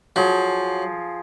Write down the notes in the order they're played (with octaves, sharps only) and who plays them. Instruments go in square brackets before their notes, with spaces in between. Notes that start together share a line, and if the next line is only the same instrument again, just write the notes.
[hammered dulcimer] F3 G#4 [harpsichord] F#3